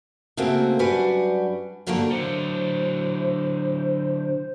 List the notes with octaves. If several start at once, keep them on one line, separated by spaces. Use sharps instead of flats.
C#3 A3 A#3 C4 F#4
F#2 G3 D4 F#4 B4 G#5
G#2 D3 D#3 A#3 D4 F#4
D3 F#3 C5